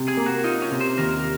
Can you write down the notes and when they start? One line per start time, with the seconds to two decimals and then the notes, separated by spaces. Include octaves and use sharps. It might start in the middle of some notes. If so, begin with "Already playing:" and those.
Already playing: C3
0.08 G#4
0.17 A#3
0.26 F#4
0.44 D#4 F4
0.62 C#4
0.71 C3
0.81 C5
0.98 D#2 A#4